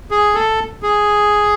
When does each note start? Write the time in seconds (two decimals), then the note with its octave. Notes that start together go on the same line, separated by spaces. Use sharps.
0.11 G#4
0.35 A4
0.83 G#4